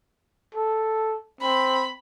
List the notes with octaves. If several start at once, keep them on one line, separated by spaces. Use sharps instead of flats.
A4
C4 B5